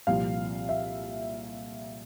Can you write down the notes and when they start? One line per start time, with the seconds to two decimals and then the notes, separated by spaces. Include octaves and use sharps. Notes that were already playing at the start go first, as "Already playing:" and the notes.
0.07 C2 A#2 F3 F5
0.69 E5